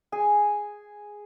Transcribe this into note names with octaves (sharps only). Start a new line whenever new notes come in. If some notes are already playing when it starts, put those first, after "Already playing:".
G#4 G#5